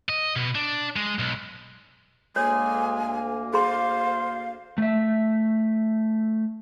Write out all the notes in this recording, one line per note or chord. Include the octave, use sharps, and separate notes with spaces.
D#5
B2
D4
G#3
B1
D2 G#3 A#3 C#5 G#5
G#4 C5 F5 C6
A3 E5